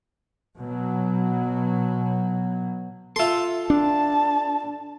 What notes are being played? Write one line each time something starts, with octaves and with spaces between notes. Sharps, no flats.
B2 F#3
F4 A4 E5 C6
D4 A5